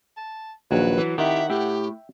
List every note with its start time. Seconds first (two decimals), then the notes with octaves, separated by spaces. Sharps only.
0.17 A5
0.71 A#1 D#2 F#3 B4
0.98 E3
1.18 D#3 E4 G4 E5 F#5
1.50 A2 G4 E5 G5